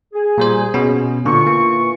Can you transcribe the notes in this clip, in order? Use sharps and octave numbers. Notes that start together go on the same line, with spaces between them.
G#4
A#2 G3 C5
B2 C#4
A#2 D3 E3 F4 C#6
A#3